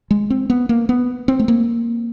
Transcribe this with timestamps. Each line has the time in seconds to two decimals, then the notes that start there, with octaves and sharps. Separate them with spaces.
0.11 G#3
0.30 C4
0.50 B3
0.69 A#3
0.89 B3
1.28 C4
1.39 A3
1.48 A#3